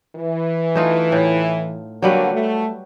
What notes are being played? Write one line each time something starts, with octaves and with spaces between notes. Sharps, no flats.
E3
A3 D#4 F4
A2
D3 F#3 G3 A#3 F#4 B4
A3 F#4